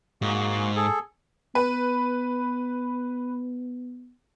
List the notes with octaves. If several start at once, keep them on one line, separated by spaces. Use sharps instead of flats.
G#2 A#3 F#4
G#4 A4
B3 B4